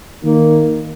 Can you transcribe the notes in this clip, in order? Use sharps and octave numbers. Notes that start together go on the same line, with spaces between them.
D#3 A#3